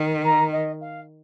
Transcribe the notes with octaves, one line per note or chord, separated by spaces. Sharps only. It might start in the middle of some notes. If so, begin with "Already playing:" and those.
Already playing: D#3
A#5
D#5
F5